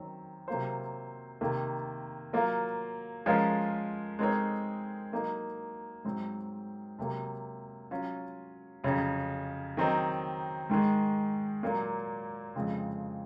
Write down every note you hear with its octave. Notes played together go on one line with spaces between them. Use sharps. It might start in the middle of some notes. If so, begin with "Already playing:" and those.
Already playing: F#2 D#3 F#3 C4
C3 F#3 A#3 F4 C5
C3 D#3 A#3
F#3 A#3 F4
F3 G#3 C#4 F4 A#4
G#3 C4 D#4 A#4 C#5
F#3 A#3 D#4
G#2 F#3 C4
C3 F#3 A#3
F#3 C#4 F4
F2 C#3 F#3 C#4
D#3 F#3 C4 D#4
G#2 D#3 G#3
A#2 F#3 A#3
F2 C#3 F3 G#3 C4